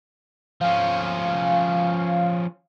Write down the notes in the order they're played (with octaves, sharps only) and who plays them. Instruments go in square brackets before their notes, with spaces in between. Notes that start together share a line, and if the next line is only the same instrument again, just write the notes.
[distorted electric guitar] F3 C#4 [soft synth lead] F5